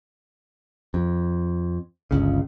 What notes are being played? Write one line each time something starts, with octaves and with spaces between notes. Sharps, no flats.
F2
G1 C#2 C#3